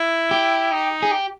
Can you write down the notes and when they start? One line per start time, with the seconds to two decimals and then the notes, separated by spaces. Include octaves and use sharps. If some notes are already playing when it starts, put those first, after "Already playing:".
Already playing: E4
0.31 G4
0.72 D#4
1.03 G#4
1.11 G4